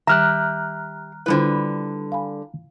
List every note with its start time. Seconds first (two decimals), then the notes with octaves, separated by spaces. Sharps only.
0.07 D#3 G3 G4 E5 A#5 F6 F#6
1.26 D3 G3 E4 F4 B4 C5
2.12 F5 G#5 B5